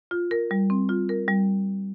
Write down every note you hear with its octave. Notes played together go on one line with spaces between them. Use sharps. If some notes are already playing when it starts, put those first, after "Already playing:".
F4
A#4
G3
C4
F4
A#4
G3